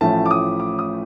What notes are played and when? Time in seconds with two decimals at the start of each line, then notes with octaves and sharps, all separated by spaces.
0.01 A1 A2 F3 A3 C#4 A5
0.26 D6
0.31 D#6
0.60 D6
0.79 D#6